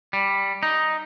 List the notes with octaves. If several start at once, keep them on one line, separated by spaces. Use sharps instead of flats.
G3
D#4